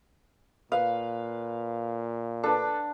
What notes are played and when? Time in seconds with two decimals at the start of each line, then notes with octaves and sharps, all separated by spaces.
0.72 A#2 B4 F5
2.43 D4 A4 B4